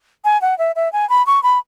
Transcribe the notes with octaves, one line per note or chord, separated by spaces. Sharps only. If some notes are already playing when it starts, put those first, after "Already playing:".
G#5
F#5
E5
E5
G#5
B5
C#6
B5